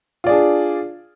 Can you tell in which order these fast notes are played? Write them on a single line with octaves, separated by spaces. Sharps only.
F4 D5 G#4 D4